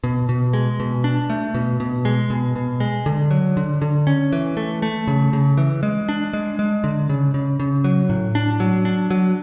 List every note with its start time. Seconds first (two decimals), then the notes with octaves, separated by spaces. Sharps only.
0.04 B2
0.29 B2
0.53 G#3
0.80 B2
1.04 D4
1.30 A3
1.54 B2
1.80 B2
2.05 G#3
2.30 B2
2.56 B2
2.80 G#3
3.06 D3
3.31 F#3
3.57 D3
3.82 D3
4.07 C#4
4.32 E3
4.57 A3
4.82 A3
5.07 C#3
5.33 C#3
5.58 E3
5.83 G#3
6.09 D4
6.33 G#3
6.59 G#3
6.84 D3
7.09 C#3
7.34 C#3
7.60 C#3
7.84 F#3
8.09 A2
8.35 D4
8.60 F#3
8.85 D4
9.10 F#3